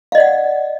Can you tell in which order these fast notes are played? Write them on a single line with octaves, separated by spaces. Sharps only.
F5 D#5 D5 F#5